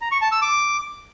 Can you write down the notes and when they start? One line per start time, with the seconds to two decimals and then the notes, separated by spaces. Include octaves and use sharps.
0.01 A#5
0.12 C#6
0.22 A5
0.32 E6
0.42 D6